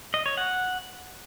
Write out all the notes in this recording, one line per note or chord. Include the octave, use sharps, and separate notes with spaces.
D#5
C#5
F#5